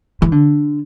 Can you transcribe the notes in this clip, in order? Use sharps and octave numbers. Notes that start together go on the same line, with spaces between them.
E3
D3